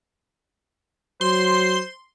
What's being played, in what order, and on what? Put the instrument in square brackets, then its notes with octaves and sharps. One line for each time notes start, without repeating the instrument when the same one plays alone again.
[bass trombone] F#3 [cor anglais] C5 [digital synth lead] C6